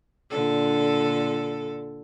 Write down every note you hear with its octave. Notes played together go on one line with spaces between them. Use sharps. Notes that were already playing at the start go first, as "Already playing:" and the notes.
A#2 D3 A4